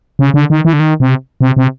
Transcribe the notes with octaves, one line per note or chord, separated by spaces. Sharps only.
C#3
D3
D#3
E3
D3
D#3
C3
C3
C3